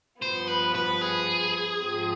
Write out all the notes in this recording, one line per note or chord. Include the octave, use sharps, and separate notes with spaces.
G2 F3 B3 C5
B4
B4
G#4
G#2 F3 C4